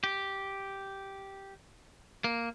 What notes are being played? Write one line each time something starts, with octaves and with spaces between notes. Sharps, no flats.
G4
A#3